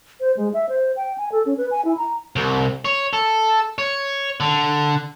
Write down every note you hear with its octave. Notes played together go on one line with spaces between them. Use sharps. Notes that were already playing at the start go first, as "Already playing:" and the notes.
C5
G#3
E5
C5
G5
G#5
A4
C#4
B4
G#5
E4
A#5
C2
C#5
A4
C#5
D3